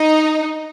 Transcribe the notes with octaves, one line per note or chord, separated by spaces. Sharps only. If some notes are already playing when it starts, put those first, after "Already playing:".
Already playing: D#4